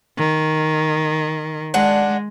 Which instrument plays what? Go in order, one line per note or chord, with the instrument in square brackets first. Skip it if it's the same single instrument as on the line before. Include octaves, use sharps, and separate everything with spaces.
[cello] D#3
[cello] G#3 [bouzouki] D4 F#5